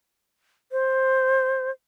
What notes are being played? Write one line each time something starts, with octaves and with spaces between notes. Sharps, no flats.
C5